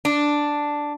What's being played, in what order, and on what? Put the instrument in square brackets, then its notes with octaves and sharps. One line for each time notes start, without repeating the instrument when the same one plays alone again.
[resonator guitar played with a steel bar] D4